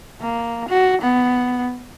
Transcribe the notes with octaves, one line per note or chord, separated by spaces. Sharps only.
A#3
F#4
B3